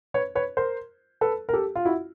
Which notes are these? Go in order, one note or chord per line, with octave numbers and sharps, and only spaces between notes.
B4 C#5
B4 C#5
A#4 C5
A4 B4
A#4
G4 A4
F4
E4 F#4